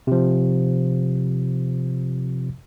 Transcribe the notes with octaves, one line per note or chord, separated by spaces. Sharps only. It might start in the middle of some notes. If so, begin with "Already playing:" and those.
C3 F3